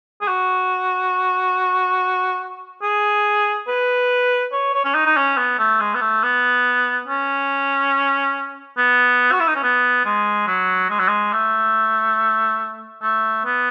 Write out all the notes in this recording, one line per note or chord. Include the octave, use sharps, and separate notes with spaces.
G#4
F#4
G#4
B4
C#5
C#5
C#4
D#4
D#4
C#4
B3
A3
G#3
B3
A3
B3
C#4
B3
F#4
E4
D#4
C#4
B3
G#3
F#3
G#3
F#3
G#3
A3
A3
B3